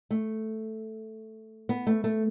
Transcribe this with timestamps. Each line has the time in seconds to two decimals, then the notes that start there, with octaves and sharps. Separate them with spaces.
0.11 A3
1.69 B3
1.87 A3
2.04 A3